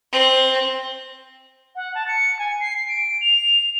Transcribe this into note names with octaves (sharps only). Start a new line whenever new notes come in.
C4
F#5
A5
C#7
G#5
C7
C7
D7
F7